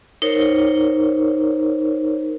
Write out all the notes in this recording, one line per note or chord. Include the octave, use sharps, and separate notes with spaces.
D#4 A#4 C5 C#5